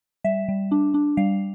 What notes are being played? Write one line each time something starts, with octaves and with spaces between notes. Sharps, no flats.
G3 E5
G3
D4
D4
G3 F5